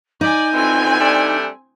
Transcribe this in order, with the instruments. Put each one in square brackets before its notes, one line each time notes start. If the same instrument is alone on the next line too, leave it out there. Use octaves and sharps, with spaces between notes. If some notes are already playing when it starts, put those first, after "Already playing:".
[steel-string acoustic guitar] D#4 [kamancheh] D5 G#5 [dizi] G6
[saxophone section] F2 D3 E3 [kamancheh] C4 G#5
[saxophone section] G3 A3 D4